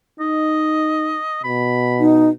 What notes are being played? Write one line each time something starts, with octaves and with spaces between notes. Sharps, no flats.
D#4 D#5
B2 B5
D#4